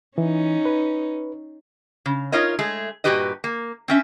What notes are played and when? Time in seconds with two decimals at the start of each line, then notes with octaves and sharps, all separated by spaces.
0.18 E3 C#4 D#4
0.65 B4
2.06 C#3
2.32 D#4 F4 A#4 C#5 D#5
2.59 G#3 A3 G#4
3.04 G2 A#2 F#4 G4 B4 D#5
3.44 A#3
3.88 C4 C#4 E5